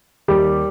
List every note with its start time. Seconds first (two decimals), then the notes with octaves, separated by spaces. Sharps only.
0.28 D#2 G3 G4